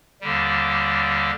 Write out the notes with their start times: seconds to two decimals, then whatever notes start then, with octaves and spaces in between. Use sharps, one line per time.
0.21 D#2 D3 G3